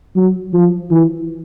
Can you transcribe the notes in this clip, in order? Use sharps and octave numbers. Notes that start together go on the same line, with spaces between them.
F#3
F3
E3